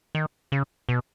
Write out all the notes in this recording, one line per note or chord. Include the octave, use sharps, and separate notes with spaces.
D#3
C#3
B2